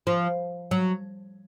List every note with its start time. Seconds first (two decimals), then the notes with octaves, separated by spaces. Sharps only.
0.07 F3
0.71 F#3